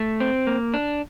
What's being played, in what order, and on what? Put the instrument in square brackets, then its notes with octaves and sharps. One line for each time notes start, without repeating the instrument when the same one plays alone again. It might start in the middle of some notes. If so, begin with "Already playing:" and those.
Already playing: [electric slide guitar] A3
C4
A#3
D4